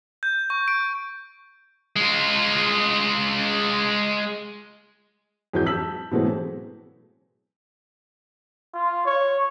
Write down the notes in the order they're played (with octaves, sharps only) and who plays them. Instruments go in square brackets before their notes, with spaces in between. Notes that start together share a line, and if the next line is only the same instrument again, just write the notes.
[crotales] G6
C#6
D7
[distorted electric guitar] G#3 F4
[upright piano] F2 E3 F#3 G#3 G6
A5 E6 B6 F#7
B2 E3 F#3 G#3 A3 C4
[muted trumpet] F4
C#5